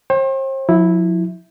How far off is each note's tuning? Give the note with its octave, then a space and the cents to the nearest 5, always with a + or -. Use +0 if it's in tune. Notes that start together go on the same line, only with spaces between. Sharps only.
C5 +40 G5 +0
F3 +45 E4 -10